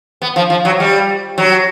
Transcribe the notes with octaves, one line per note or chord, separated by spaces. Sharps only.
B3
F3
F3
F#3
G3
F#3